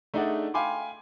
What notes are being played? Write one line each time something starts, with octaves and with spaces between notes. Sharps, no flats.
A3 D4 D#4 G#4 D5 F#5
F5 G5 G#5 B5 C6 D6